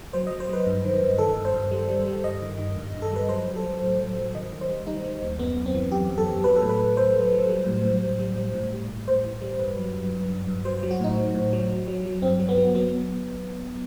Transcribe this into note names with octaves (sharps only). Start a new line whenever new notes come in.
F#3 C5
F#3 D#5
C5
F#3 B4
G2
D#3
G2
D#3 A4
G2
C5
G2
G3
G3
G3
G2 D#5
D#3
D#3
G2
G2
A4
G3 B4
F#3 C5
F#3
A4
F#3
A2
F#3
F#3
D#3 D#5
D#3
C5
G3
G3 D#4
G3
D#2
F#2 B3
F#2
C4
E3
F#2 G4
F#2
A4
F#2
F#3 B4
A4
A2
B4
A2
F#3 C5
F#3
F#3
G3
A2
A2
G3
G3
G3
A2
G3
A2
A2 C5
E3
G3
G2 B4
F#3
G2
G2
G2
G2
F#3 C5
C5
F#3
F#4
A2 D#4
F#3
A2
F#3
F#3
F#3
F#3
G2 C4
F#3
B3
F#3
F#3 B3